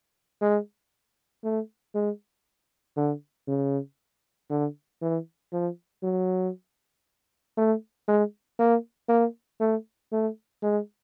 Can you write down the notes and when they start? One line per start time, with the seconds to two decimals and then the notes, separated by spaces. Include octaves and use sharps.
0.42 G#3
1.44 A3
1.95 G#3
2.97 D3
3.48 C#3
4.50 D3
5.02 E3
5.53 F3
6.03 F#3
7.57 A3
8.08 G#3
8.59 A#3
9.09 A#3
9.60 A3
10.12 A3
10.63 G#3